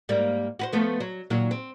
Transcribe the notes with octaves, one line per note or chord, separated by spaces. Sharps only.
G#2 G3 A#3
F#4 B4 C5
F3 A3 B3
F#3
A#2 D#3 F#3
C4